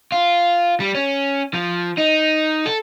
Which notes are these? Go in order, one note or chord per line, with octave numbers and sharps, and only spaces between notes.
F4
G3
C#4
F3
D#4
A4